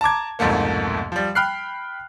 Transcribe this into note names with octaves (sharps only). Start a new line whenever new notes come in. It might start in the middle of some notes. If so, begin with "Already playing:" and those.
A5 A#5 D6 G#6
C2 F2 G#2 B2 A3 A#3
F3 G3
G5 B5 F6 F#6 C7